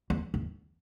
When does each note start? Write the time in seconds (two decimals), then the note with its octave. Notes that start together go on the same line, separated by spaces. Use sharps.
0.10 E2
0.34 E2